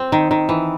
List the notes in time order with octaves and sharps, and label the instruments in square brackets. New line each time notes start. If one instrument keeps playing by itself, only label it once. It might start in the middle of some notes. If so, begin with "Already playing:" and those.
Already playing: [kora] C4
D#3
D#3
E3